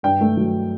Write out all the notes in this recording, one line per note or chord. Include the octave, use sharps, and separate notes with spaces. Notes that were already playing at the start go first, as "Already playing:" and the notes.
G2 G5
A3
F#3